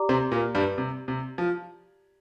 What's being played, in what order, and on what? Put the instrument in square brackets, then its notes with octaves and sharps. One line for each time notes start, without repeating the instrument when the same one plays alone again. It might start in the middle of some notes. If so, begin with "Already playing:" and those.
Already playing: [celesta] G4 D5 A#5 D6
[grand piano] C3 C4
A#2 A#3
G2 G3
C3
C3
F3